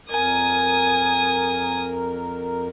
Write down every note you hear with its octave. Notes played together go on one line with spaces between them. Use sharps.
F2 A#4 G#5 D#6